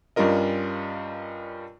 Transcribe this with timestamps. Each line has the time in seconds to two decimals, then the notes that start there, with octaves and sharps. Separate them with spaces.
0.16 G2 G3 C#4 F4 A#4 D#5